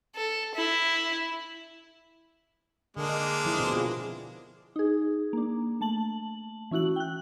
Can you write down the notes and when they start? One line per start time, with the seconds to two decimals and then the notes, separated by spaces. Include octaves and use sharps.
0.16 A4
0.55 E4
2.97 D3 G#3 A#3 D4
3.09 D#5
3.45 F3 E4
3.57 B2 B3 C4
3.73 F4 G#4
4.76 D#4 G#4
5.33 A#3 D4
5.81 A3 A5 F#7
6.71 E3 C#4 E4 F#4 F#7
6.96 G5 F#6